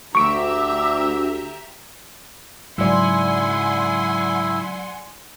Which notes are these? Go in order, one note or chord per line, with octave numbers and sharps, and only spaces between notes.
D2 G4 E5 A#5 C#6 D6 E6 D7
G#2 C#3 F#3 E4 D5 F#5 G#5 C6